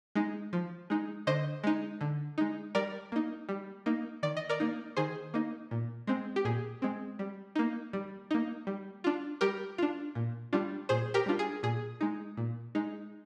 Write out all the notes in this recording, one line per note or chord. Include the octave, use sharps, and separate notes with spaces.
G#3 D#4
F3
G#3 D#4
D3 C5 D#5
G#3 D#4
D3
G#3 D#4
G3 A#4 D5
A#3 D#4
G3
A#3 D#4
D#3 D5
D#5
A#4 D5
A#3 D#4
D#3 G#4 C5
A#3 D#4
A#2
G#3 C4
G4
A#2 G#4
G#3 C4
G3
A#3 D#4
G3
A#3 D#4
G3
D4 F4
G3 G4 A#4
D4 F4
A#2
G3 D4 F4
A#2 G#4 C5
G4 A#4
G3 D4 F4
G#4
A#2 G#4
G#3 D#4
A#2
G#3 D#4